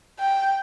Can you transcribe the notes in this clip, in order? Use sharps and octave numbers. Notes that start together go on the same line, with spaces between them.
G5